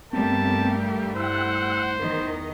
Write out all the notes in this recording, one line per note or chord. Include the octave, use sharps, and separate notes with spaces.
G2 G3 A3 B3 C4 G4 A#4 A5
E4 C5 F#5 G5 E6 F#6
E2 D#3 D#4 A#4 D#5